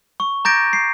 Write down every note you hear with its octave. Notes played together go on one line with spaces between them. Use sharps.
C#6
A#5 D6 G6 A6 A#6 D7
C7